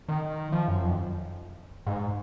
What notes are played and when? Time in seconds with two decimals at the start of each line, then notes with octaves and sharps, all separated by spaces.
0.08 D#3
0.52 F3
0.68 F#2
0.82 F2
1.87 G#2